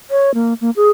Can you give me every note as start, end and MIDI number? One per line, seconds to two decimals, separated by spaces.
0.11 0.33 73
0.34 0.54 58
0.61 0.70 58
0.76 0.90 68